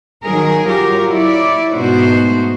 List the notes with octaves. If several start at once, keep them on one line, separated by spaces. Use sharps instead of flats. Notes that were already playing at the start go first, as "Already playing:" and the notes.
D#3 F#3 G#4 A#4
F#3 F4 G4 A#4
E4 C#5 D5
G#2 B2 A3 D#4 F#4 C5